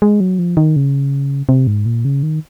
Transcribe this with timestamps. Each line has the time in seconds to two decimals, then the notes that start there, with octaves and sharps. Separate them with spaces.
0.02 G#3
0.20 F#3
0.39 F3
0.57 D#3
0.76 C#3
1.49 C3
1.67 G#2
1.86 A#2
2.05 C#3
2.23 D#3